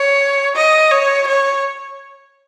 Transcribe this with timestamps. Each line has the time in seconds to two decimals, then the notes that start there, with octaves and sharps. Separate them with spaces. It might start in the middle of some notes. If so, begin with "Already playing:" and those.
Already playing: C#5
0.55 D#5
0.91 C#5
1.27 C#5